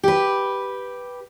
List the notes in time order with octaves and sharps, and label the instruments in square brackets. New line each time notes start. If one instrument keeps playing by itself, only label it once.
[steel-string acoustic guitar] G4 B4